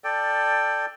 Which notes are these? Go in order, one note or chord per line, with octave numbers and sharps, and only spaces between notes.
A4 D5 G5